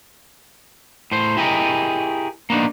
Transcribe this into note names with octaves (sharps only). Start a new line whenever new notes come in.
A2 C5
E4 G4 G#4 A#4 D#5
A#3 B3 D4 D#4